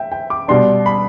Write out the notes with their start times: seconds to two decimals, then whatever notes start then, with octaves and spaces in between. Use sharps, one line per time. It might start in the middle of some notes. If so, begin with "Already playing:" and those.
Already playing: E5 G5
0.12 G5
0.30 D6
0.48 B2 G3 D4 C6
0.86 B5